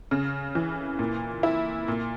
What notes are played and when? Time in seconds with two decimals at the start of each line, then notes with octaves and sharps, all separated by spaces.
0.11 C#3
0.55 E3
0.99 A#2
1.43 E4
1.88 A#2